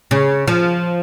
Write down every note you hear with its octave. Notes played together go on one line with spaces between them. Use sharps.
C#3
F3